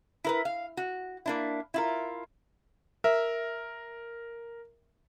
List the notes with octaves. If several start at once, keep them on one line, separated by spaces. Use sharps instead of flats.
E4 A#4 B4
F5
F#4
A#3 D4 E4
E4 F4 A#4
A#4 E5